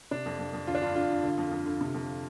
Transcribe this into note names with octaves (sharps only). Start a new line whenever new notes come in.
C3 D4
F2
F2
F2
D3 F4
D4
G2 F4
G2 F4
G2
D3
F2
F2
D3
C3
F2